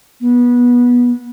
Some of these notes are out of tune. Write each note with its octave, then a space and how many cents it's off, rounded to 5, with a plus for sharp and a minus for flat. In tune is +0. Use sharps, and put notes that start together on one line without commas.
B3 -20